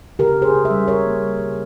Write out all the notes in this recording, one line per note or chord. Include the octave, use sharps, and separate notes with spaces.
C#3 G4 A#4
C#3
G#4 C5
C#3
C5 E5
G3
G3 A#4 C#5
A#3
G3
C#3